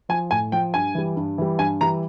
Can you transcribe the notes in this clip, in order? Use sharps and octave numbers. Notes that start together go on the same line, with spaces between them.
F3 G#5
A2 G#5
F3 G5
G2 G#5
E3 G3
G2
E3 G3
G2 G#5
E3 G3 A#5